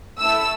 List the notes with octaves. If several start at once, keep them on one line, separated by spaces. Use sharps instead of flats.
A3 E4 A4 E6